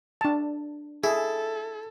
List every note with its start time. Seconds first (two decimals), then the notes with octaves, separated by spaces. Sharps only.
0.21 D4 A5
1.04 E4 G#4 A4